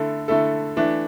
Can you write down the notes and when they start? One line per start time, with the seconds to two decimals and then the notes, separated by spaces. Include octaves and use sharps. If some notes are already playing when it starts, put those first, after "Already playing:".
Already playing: D3 A3 E4 A4
0.28 D3 A3 E4 A4
0.77 E3 A3 D4